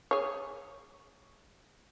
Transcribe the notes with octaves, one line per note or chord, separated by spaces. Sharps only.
G#4 C#5